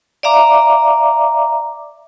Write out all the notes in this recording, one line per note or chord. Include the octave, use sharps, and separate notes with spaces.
D5 E5 F5 A#5 D6